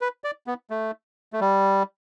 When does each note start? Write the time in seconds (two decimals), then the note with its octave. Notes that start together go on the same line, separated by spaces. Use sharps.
0.01 B4
0.24 D5
0.47 B3
0.70 A3
1.33 A3
1.41 G3